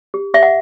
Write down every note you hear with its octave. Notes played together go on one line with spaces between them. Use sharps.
G4
G4 E5
F#5